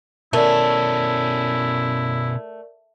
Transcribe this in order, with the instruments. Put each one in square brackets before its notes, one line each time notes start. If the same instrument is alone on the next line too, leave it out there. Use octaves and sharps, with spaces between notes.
[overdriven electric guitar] B2 C#4 [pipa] A3 [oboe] E4 [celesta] A#4 D5